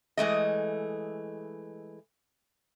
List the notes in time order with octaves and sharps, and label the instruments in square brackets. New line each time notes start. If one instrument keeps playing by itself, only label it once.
[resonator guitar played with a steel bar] E3 G#3 A3 D#5